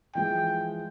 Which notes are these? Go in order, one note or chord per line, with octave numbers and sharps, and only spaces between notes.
E3 F3 G#3 G5